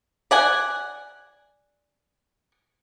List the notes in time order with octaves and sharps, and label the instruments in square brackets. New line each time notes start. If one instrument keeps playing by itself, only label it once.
[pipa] D5 F#5 G#5